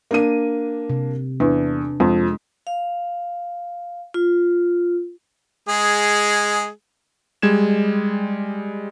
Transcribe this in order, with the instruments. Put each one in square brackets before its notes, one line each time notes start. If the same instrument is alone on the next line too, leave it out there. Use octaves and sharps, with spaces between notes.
[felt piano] A#3 D4 D#7
[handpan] C3
[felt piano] E2 [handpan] D4
[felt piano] F2 [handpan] G#3
[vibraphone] F5
F4
[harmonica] G#3 G#4
[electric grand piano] G3 G#3 G#6 E7